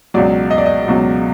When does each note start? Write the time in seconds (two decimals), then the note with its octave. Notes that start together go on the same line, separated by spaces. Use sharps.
0.14 C#2 B2 F#3 D5
0.51 D#5
0.58 D5
0.66 D#5
0.88 C#2 B2 F#3